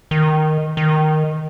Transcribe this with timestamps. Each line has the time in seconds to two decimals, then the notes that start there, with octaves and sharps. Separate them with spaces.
0.11 D#3
0.77 D#3